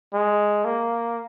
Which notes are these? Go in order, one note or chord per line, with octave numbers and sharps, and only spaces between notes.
G#3
A#3